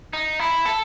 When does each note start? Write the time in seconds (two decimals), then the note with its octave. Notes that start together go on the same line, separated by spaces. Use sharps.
0.13 D#4
0.39 E4
0.65 A4